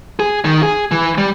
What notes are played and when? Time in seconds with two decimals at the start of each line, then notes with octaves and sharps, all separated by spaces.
0.20 G#4
0.45 D#3
0.63 G#4
0.91 E3
1.18 G3